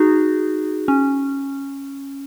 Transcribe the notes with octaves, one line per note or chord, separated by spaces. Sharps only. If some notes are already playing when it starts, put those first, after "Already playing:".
Already playing: D#4 F#4 G#4
C#4